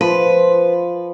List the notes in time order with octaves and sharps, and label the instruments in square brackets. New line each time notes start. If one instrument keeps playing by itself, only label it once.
[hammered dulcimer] F3 [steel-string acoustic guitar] B4